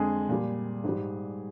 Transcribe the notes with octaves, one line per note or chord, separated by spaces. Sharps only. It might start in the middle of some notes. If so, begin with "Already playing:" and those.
Already playing: F2 D3 G#3 G#4
A#2 G3
G#2 G3